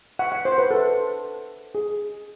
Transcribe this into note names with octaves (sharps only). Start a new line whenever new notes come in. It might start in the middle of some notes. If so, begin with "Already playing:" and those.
F#5
F#5
C5
B4
A4
G#4